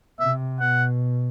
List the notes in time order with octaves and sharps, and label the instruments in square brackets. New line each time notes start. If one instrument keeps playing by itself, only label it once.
[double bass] C3 [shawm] E5
[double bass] B2 [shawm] F#5